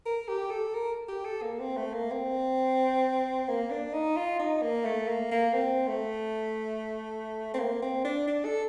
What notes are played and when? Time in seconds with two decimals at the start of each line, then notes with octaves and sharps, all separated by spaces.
0.06 A#4
0.28 G4
0.51 A4
0.74 A#4
1.08 G4
1.25 A4
1.42 A#3
1.60 C4
1.77 A3
1.94 A#3
2.11 C4
3.48 A#3
3.71 D4
3.93 D#4
4.17 F4
4.39 D#4
4.62 A#3
4.85 A3
5.08 A#3
5.31 A#3
5.54 C4
5.88 A3
7.54 C4
7.59 A#3
7.82 C4
8.05 D4
8.28 D4
8.45 A4